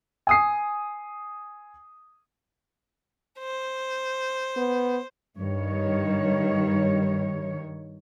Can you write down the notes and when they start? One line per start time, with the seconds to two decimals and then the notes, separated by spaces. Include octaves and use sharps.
0.27 G#5 D#6 C7
3.39 C5
4.57 B3
5.39 G2 D#3 C#5